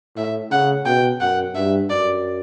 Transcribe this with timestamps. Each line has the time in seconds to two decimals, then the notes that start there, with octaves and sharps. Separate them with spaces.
0.17 A2 E5
0.51 C#3 F#5
0.85 B2 G5
1.20 F#2 F#5
1.55 G2 E5
1.89 F#2 D5